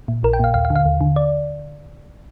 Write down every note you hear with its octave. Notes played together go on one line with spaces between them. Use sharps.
A#2
A#1 A#4
G5
A#2 F5
D#2 F5
F5
D3
F5
D#2
D3
D5